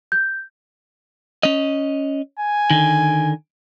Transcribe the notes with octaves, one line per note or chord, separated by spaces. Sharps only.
G6
C#4 D#5
G#5
D3 D#3